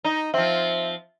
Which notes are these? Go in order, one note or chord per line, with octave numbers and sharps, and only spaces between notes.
D#4
F3 C4 E5